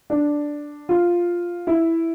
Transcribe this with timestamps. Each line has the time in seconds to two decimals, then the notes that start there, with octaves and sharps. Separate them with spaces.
0.10 D4
0.89 F4
1.67 E4